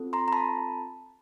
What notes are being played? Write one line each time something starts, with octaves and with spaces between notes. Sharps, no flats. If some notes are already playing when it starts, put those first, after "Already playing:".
Already playing: C4 F4 A4
A#5 C6
A#5
A5 B5